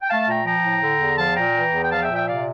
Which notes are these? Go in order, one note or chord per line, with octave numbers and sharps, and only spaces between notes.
G5
A3 F5 A5
A#2 G5 A#5
F3 G5 A#5
A2
D3
E2
F3 F5 A5
A#2 G5 A#5
E3
E2
G5
F3 F5 A5
E5 G5
A#2
E5 G5
C3 D5 F5